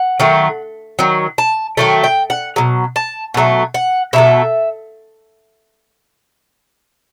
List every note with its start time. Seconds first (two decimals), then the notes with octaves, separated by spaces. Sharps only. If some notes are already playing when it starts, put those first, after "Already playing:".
Already playing: F#5
0.20 D#3 F#3 A3
0.99 D#3 F#3
1.38 A5
1.77 D#3 F#3 A3 G5
2.04 G5
2.30 F#5
2.56 B2 F#3
2.96 A5
3.34 B2 F#3 A3
3.74 F#5
4.13 B2 F#3 A3 E5